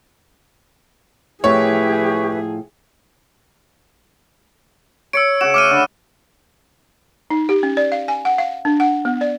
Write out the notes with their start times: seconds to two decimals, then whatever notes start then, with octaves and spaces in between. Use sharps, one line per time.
1.44 A2 F3 G4 G#4 B4 C#5 E5
5.13 C#5 E6 C#7 D7
5.41 C#3 F#4 E7
5.54 A3 D6 F6 D#7
5.71 D3 B5
7.30 D#4
7.49 G4
7.63 C#4
7.77 D5
7.92 F5
8.08 G#5
8.25 F#5
8.38 F5
8.65 D4
8.80 F#5
9.05 B3
9.21 D5